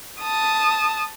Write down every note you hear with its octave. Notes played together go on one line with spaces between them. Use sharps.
A5 D#6